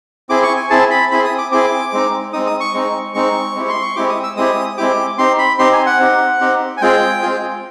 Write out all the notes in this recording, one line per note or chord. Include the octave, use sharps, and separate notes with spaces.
C4 E4 G#4 D6
C#6
G#5
C4 E4 G#4 A5
B5
C4 E4 G#4 B5
D#6
D6
C4 E4 G#4 D6
G#3 C4 D#4
G#3 C4 D#4 D#6
D#6
C#6
G#3 C4 D#4
G#3 C4 D#4 C#6
G#3 C4 E4 G4
C6
C#6
G#3 C4 E4 G4 D6
D#6
E6
G#3 C4 E4 G4 D#6
G#3 C4 E4 G4 D6
C4 D#4 G4 C6
B5
C4 D#4 G4 C6
G#5
F#5
C4 D#4 G4
C4 D#4 G4
G#5
G#3 C4 F4 G#4 G5
G#3 C4 F4 G#4